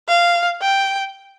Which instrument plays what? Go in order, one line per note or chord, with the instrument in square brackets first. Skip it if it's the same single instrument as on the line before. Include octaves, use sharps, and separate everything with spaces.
[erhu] F5
G5